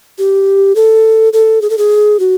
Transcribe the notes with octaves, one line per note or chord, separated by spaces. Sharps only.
G4
A4
A4
G#4
A4
G#4
F#4